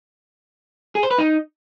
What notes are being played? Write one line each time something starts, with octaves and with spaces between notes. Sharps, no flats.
G#4
C5
B4
D#4